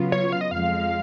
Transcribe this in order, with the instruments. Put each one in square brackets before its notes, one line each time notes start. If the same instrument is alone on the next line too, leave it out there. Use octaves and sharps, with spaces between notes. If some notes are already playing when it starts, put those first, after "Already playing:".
Already playing: [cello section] C#3 F#3 B3 F4
[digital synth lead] C#5
F5
D#5
[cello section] F2 F3 G#3 [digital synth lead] F5